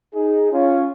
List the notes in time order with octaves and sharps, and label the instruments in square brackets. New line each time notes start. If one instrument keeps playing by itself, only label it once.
[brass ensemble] D#4 G#4
C#4 F4